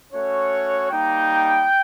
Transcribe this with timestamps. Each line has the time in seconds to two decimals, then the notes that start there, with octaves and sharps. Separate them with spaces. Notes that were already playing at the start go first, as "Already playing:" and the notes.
0.13 A3 C#4 F#4 C#5
0.90 G3 A#3 D#4 G5